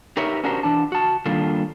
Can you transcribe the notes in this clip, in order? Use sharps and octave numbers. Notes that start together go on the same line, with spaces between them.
D#4 G4 A#4 B4 C#5 E5
C#4 D4 F#4 G4 A#4 C5
E3 D4 A5
F#4 A5
D#3 G3 A#3 D4 F4 A4